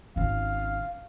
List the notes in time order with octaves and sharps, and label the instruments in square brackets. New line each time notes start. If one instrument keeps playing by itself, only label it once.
[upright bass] G#1 C#4 [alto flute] F5